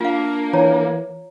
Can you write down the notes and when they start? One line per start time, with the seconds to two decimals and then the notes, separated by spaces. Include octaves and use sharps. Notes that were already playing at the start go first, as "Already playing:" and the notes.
0.01 A#3 D4 F4 F5
0.53 E3 C#5 A#5